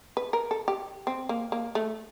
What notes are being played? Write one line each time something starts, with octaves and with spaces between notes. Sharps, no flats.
B4
A#4
A4
G4
C4
A#3
A#3
A3